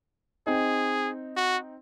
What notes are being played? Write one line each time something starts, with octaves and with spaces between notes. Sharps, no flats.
C4 D#4 G#4
F#4